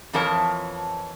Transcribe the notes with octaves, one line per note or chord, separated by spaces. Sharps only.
F2 E3 F3 A#4 C#5 A5